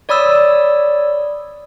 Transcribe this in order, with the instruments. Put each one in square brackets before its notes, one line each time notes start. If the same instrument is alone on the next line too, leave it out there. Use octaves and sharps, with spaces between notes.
[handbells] C#5 D5 B5 D#6 E6